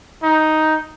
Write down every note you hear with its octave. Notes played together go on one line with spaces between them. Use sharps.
D#4